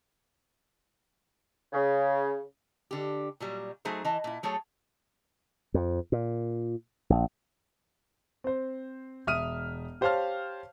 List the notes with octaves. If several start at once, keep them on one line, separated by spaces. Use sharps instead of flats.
C#3
D3 G4
A#2 F#3 G3
F#3 A3 D#4 G#4 C5
E3 D#5 A5
A#2 E4
F#3 A3 G#4 A4 C#5
F2
A#2
A#1
C4 C5
E1 E5 D#6 F6 D#7
G4 C5 C#5 F5 A5 F6